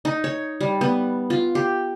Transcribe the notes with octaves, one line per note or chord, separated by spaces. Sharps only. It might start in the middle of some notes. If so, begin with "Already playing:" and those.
D#4
C#5
G3
B3
F4
G4